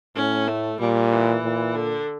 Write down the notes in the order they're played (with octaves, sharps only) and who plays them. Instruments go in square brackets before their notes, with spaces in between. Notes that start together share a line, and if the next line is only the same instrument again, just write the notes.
[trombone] A2 [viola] C#4
[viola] A3
[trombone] A#2 [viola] G3
[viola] E3
[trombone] A#2
[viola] D3